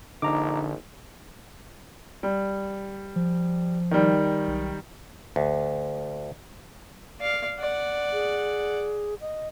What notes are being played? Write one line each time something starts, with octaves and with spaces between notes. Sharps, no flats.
A#1 D3 D#4 A#5 D6
G3
F3
D#3 G3
B1
D2
D5 F5
D5 F#5
G#4
D#5